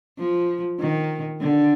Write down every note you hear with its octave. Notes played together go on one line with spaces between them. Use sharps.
F3
D#3
D3